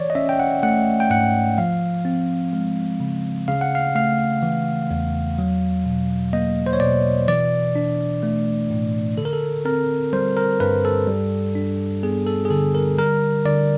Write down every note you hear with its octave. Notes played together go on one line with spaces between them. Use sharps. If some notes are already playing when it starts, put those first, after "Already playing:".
Already playing: E3 C#5 D5
D#5
C#4 E5
G5
F#5
A3 F#5
G5
G#2 F#5
F3 F5
C4
G#3
C#3
C#3 F5
F#5
F5
A3 F5
E3
E2
F#3
B2
A#3 D#5
C5
C#5
B2 D5
E3 D5
D4
A3
A2
D3 A4
A#4
A4
C4 A#4
G3 C5
A#4
G2 B4
A4
G3
D4
B3 G#4
A4
G#4
D3 A4
A#4
G3 A#4
D3 D5